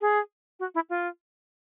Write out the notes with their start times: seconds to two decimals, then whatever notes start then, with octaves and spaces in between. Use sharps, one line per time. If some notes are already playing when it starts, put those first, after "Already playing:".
0.01 G#4
0.60 F#4
0.75 E4
0.90 F4